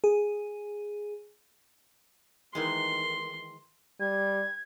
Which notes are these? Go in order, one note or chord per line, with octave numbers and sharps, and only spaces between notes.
G#4
D#3 E3 G#3 C6
G3 G#6